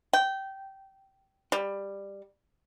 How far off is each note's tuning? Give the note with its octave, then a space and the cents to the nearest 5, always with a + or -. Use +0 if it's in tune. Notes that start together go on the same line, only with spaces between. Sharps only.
G5 -15
G3 +15